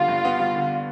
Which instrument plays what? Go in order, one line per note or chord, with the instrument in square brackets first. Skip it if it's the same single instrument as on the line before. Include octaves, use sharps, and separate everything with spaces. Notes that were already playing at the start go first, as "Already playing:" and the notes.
Already playing: [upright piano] D3 G3 B3 [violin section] F4
[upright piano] G2
B3
G3
D3